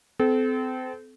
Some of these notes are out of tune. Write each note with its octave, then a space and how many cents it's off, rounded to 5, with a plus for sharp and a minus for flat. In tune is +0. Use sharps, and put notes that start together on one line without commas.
C4 -30 A4 -30